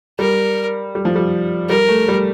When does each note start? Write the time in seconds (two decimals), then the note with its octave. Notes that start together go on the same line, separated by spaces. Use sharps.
0.19 G3 A#4
0.95 G3
1.05 F3
1.16 G3
1.70 G3 A#4
1.88 A3
2.08 G3